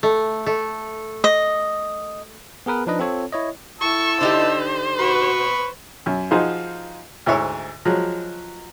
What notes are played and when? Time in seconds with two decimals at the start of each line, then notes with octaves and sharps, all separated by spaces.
0.03 A3
0.46 A3
1.24 D#5
2.66 B3 G#4 A#4 B4
2.87 F3 D4 D#4 B4 D#5
2.99 C4 F4 A4 C#5
3.33 E4 C#5 D#5
3.81 E4 A5 C#6 E6
4.21 D3 D#4 G4 C5
4.99 F#4 B4 B5 C#6
6.06 F#2
6.31 F3 D#4 F4 F#4 G#4 C5
7.26 D2 G#2 E4 C#5 C#6
7.85 F3 F#3 G#3